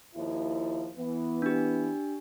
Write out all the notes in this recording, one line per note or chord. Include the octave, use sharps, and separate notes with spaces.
D#2 F3 E4
E3 B3
D4 G4